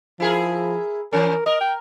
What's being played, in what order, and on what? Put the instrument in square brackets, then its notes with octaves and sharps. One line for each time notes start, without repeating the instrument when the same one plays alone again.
[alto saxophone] F3 [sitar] E4 G#4 A#4
[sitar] E3 C#4 [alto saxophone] A#4
[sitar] A#4 [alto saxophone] D#5
[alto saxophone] G5